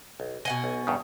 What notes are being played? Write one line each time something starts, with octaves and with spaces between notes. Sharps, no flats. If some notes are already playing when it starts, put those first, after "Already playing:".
B1
B2 D#5 F#5 G#5
B1
E2 G2 C#3